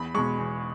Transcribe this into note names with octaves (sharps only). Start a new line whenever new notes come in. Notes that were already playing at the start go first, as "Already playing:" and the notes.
Already playing: E2 B5
B2 G#3 C#6
E2